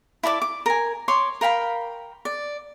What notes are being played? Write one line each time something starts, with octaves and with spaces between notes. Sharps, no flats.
E4 A4 D5 D6
D6
A#4 G#5
C#5 C6 D6
A#4 F5 G5 B5
D5